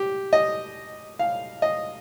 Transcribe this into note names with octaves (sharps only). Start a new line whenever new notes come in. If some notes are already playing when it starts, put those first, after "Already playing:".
Already playing: G4
D#5
F5
D#5